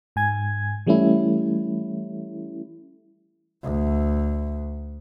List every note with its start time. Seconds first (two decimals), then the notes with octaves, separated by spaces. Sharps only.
0.16 G#2 G#5 G#6
0.87 E3 G3 A3 C#4 E4
3.63 D2